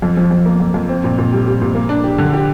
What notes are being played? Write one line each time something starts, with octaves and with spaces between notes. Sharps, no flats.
F2
F3
F2
A#3
F2
F2
C4
A#2
A#2
G3
G3
A#2
A#3
D4
G4
D3
G4